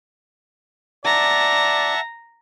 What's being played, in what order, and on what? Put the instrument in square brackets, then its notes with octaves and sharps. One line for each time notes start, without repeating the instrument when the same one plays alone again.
[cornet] D5 [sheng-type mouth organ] E5 F#5 A5 [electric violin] A#5